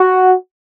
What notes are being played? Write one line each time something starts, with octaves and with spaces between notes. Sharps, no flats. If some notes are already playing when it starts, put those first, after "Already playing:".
Already playing: F#4